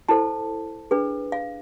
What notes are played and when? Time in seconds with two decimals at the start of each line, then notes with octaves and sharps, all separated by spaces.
0.09 E4 A4 C5 A5
0.91 D4 G#4 B4
1.32 F5